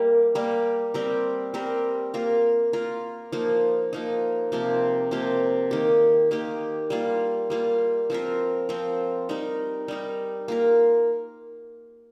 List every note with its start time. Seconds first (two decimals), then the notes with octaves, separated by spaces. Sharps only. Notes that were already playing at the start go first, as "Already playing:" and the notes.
Already playing: G3 A#3 G4 A#4
0.35 G3 A#3 G4 A#4
0.94 G3 C4 G4 A#4
1.54 G3 C4 G4 A#4
2.14 A#3 F4 A#4
2.73 A#3 F4 A#4
3.32 F3 A#3 D#4
3.93 F3 A#3 D#4
4.52 C3 F3 A#3 G4
5.11 C3 F3 A#3 G4
5.71 D#3 A#3 G4
6.31 D#3 A#3 G4
6.90 G3 A#3 F4
7.50 G3 A#3 F4
8.10 F3 C4 F4 A#4
8.69 F3 C4 F4 A#4
9.29 G3 D#4 A#4
9.88 G3 D#4 A#4
10.48 A#3 F4 A#4